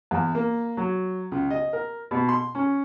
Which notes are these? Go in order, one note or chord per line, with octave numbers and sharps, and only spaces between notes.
E2
A#3
F#3
C#2
D#5
A#4
B2
C6
C#4